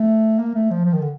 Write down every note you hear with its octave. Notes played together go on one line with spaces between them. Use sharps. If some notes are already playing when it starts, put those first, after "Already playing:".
Already playing: A3
A#3
A3
F3
F3
D#3
D3